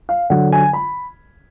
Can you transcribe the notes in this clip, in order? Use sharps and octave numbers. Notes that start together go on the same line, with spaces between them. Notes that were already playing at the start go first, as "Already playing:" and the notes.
F5
D3 F#3 F#5
G#5
B5